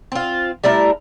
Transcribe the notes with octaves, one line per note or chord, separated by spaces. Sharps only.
C4 F4
G3 A3 E4 A#4